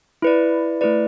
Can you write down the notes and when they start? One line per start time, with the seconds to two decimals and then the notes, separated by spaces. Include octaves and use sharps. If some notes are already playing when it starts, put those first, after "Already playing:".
0.22 E4 B4 D5
0.81 A3 E4 B4 D5